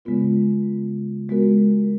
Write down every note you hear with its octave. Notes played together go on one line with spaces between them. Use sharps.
C#3 G#3 B3 F4 A#4
G#3 B3 F#4 A#4